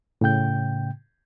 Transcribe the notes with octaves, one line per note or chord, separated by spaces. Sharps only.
A2 C#3 G5 G6